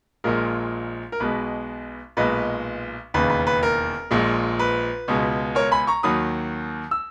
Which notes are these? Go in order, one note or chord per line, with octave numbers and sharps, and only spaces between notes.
A#1 A#2 G#3 A#4
A#4
B1 B2 G#3 B4
B1 A#2 G#3 B4 D#5
E1 D#2 C#3 B4
B4
B4
A#4
A#1 A#2 G#3
B4
C#2 B2 G#3
A#4 C#5
G#5 B5
A#5 C#6
D#2 D#3 F#3 B5 D#6
E6